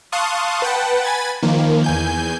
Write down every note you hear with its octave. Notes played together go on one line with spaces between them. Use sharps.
F5 A5 C6 C#6 D#6 F#6
B4 F#5 G5 A5
G#5 B5 G#6 A6
D#3 F3 A#3
E2 G#5 G6